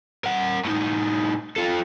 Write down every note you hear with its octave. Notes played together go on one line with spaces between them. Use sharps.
A#4 F#5
A2 D#4
F4 A4